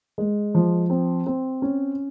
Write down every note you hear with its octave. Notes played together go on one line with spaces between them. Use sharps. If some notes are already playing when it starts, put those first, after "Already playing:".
G#3
F3
C4
C4
C#4